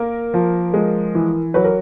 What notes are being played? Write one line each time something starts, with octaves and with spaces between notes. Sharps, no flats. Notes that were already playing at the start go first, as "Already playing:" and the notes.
Already playing: A#3 A#4
F3
G#3
E3
F#3 B4
A#4